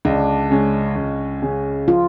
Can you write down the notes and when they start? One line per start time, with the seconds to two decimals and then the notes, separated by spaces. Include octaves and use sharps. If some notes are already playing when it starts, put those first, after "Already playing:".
0.05 C#2 D4
0.50 C#3 G#3 C#4
0.96 C#2
1.42 C#3 G#3 C#4
1.88 F3 F4